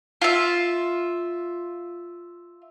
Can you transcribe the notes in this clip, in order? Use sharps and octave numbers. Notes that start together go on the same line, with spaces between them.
F4 E5